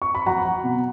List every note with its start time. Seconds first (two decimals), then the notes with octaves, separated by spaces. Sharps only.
0.02 C#6
0.15 B5
0.26 F#3 F#5 A#5
0.45 F#3
0.64 B2